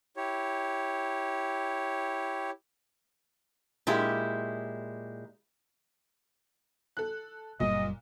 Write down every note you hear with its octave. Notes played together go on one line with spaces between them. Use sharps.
E4 G4 C#5
A#2 G#3 E4 G4
A4 F#6
F#1 A#2 G3 D#5